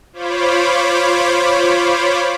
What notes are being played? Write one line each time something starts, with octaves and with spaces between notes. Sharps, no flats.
F4 C5 C#5 B5 D6